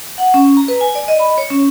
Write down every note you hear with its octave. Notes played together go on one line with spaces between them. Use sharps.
F#5
C#4
A#5
B4
G#5
D5
D#5
B5
C#5
C#4